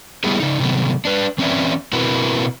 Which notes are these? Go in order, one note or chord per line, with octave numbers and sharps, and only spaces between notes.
G3 A3 B3 E4 G4 G#4
C#3 D#4
C3 D#3 F#3 B3
D4 B4
E3 C4 C#4 B4 D5 E5
B2 C4 E4 F#4 A#4 B4